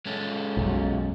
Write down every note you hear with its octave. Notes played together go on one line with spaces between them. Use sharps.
G#3 C#4 A4
B1 F#2